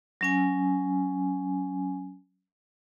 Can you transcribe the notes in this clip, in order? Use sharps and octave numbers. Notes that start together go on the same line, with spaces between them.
F#3 C#4 G#5